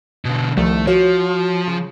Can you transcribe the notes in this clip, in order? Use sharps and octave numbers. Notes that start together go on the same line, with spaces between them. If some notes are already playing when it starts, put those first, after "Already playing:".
B2 D3
C2 D#3 F3 A3
F3 F#4 C#5
C#3